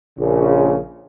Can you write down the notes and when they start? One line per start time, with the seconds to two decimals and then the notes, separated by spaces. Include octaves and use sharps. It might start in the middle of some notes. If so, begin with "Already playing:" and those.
0.19 A#1 C#3